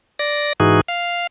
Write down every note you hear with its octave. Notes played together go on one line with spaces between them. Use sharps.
D5 A#6
G#2 E3 D#4 F#4 G#4
F5